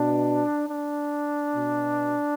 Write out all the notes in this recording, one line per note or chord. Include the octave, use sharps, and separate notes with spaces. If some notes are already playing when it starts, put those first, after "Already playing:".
Already playing: B2 D4
D4
B2